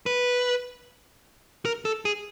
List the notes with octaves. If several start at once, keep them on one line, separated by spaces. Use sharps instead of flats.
B4
A#4
A4
G#4